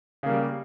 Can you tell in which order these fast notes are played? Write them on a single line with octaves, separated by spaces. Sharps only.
C#3 A#3 G3